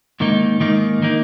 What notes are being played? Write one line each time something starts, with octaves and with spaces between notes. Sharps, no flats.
G#2 D#3 A#3 D#4
G#2 D#3 A#3 D#4
D#3 A#3 D#4